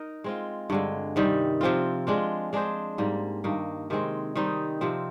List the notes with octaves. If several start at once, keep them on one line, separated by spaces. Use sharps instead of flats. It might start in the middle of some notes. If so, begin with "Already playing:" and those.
Already playing: D#4 A#4
G#3 C4 F4
G2 D3 G#3
C3 D#3 G3
C3 F3 C4 F4
G#3 D4 F4
G#3 D4 G#4 C5
G#2 G3 A#3
G2 D#3 A#3
C3 D#3 G#3 C4
D#3 G3 C4 D#4
C3 F3 C4